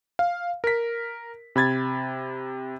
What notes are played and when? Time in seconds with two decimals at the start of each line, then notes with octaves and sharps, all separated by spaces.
0.19 F5
0.64 A#4 B6
1.56 C3 B5 G#6 A6